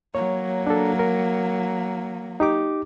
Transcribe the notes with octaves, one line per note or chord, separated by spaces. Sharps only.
F#3 A#3 C#5
D4 A4
A#4
D#4 G4 D6